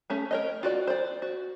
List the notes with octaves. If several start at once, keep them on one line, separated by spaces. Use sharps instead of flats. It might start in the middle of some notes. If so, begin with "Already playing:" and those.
A3 C#4 G#4
A#4 C#5 D#5
F4 F#4 D5
C5 D5
F#4